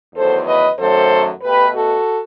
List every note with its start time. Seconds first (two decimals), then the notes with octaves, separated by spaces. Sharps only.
0.14 E2 D#3 F#3 A3 A4 C5
0.47 B4 D#5
0.79 F#2 D#3 F#3 A3 A4 C5
1.43 B2 A3 G4 B4
1.76 F#4 A4